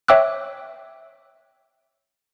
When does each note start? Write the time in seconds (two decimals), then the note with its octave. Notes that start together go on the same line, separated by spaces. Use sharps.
0.08 C#5 E5 G5 D6 E6 F#6